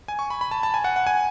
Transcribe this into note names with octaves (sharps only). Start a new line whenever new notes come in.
G#5
C#6
B5
B5
A5
A5
G#5
F#5
F#5
G#5